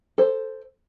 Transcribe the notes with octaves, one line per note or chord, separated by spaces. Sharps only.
A4 C5